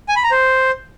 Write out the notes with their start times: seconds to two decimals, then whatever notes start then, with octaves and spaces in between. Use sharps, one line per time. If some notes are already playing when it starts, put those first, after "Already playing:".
0.08 G#5
0.16 B5
0.24 A#5
0.31 C5